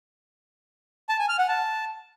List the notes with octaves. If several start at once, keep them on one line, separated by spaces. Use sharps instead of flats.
A5
G#5
F6
F#5
A5